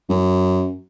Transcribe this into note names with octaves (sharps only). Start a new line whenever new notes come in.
F#2